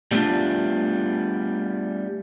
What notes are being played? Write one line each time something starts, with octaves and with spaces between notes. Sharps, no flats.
G3 A3 B3 C4 D4 F4